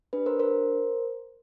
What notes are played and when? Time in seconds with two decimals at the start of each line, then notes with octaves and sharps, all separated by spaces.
0.13 D4 G4 B4
0.26 A#4 C5
0.39 A#4 C5